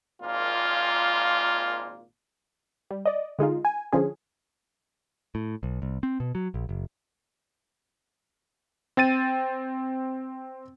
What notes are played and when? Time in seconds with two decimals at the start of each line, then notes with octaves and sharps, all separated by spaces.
0.23 G#1 A#2 A#3 F4
2.91 G3
3.05 D5 D#5
3.39 D3 G#3 D#4 F4
3.65 G#5
3.92 D3 F3 C#4 G#4
5.35 A2
5.63 B1
5.82 C2
6.03 C4
6.20 B2
6.35 F#3
6.54 A#1
6.69 F#1
8.97 C4 G5 A6 D#7